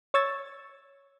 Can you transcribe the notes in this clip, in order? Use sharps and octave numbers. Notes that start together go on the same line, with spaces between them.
C#5 C#6 E6 G#6 A6